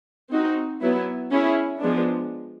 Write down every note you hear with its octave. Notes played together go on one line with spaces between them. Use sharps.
C4 D#4 F#4
F#3 B3 E4
C#4 E4 G#4
F3 G#3 B3 D4